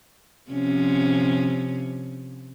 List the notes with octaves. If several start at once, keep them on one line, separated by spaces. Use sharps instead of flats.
C3 F3 C#4